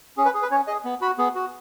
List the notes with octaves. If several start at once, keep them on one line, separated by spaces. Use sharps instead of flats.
C#4 G#4
B4
G#4
B4
C#4 C#5
G#4 D#5
B3
F#4 B5
B3 G#4
F#4